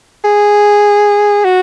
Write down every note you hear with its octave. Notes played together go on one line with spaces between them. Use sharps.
G#4
F#4